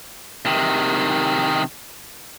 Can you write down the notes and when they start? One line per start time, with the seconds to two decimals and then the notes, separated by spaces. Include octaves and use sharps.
0.46 C3 D#3